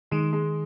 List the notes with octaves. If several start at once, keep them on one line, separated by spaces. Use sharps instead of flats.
D#3 G#3
G#3